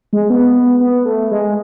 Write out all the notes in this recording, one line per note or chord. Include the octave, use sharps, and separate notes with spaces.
G#3
B3
B3
A3
G#3